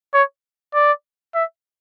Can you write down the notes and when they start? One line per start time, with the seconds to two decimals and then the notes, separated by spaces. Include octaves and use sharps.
0.14 C#5
0.74 D5
1.35 E5